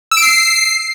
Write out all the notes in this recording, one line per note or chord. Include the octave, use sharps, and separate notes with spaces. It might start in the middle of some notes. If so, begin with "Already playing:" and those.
E6
D7
C7